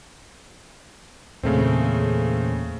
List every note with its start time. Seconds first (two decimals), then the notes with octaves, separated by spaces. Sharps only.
1.43 E2 A#2 C#3 A3 C4